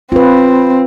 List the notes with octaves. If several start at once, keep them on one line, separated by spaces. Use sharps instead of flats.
C4 F4 B4